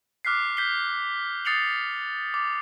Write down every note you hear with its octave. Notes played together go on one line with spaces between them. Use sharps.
D6 F6 F#6 B6 C7
G6 B6 C7 G7
D#6 A6 C7 C#7 F7 F#7
D6